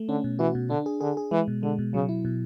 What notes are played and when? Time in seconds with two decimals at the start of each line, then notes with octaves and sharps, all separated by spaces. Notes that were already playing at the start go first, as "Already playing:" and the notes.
Already playing: A3
0.09 D3 C#4
0.24 B2
0.39 E3 F#4
0.55 B2
0.70 D3 D4
0.86 G#4
1.01 D3 G#4
1.17 G#4
1.31 E3 G#3
1.48 B2
1.63 D3 G#3
1.79 B2
1.94 C#3 F#3
2.09 E4
2.25 B2